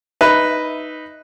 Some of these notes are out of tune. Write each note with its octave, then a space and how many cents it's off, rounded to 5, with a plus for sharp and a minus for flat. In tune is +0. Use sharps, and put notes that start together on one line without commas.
D#4 +0 B4 +0 E5 -5